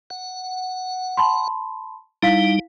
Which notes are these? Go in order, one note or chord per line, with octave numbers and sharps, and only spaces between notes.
F#5
A5 B5 C6
G3 D#4 E4 F5 B6